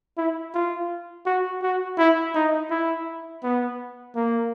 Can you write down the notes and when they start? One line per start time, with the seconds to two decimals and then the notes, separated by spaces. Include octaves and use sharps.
0.17 E4
0.54 F4
1.26 F#4
1.62 F#4
1.98 E4
2.35 D#4
2.70 E4
3.43 B3
4.15 A#3